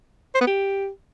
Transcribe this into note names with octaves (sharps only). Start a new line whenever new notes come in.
C5
B3
G4